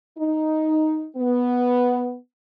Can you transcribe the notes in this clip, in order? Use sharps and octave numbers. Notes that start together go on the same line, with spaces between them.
D#4
B3